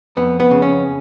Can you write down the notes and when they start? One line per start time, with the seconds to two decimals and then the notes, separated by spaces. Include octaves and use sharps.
0.17 F2 B3
0.40 B3
0.51 C#3
0.62 C#4